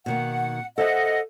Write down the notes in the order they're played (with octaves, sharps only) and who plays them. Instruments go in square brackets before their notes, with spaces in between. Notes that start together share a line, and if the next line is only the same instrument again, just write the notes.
[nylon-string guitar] B2 D#3 A#3 [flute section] F#5
[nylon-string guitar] A4 C5 E5 [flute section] D#5 F#5